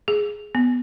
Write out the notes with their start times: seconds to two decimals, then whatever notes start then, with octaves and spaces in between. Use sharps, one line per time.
0.08 G#4
0.55 B3